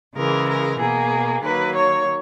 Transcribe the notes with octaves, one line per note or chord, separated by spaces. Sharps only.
C#3 E3 G#3 A#4
A#4
B2 A#3 G#4
D#3 F#3 A#3 B4
C#5